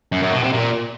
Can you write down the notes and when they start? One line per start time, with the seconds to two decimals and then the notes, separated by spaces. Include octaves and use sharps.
0.12 F#2
0.22 F#2
0.33 B2
0.43 C3
0.53 A#2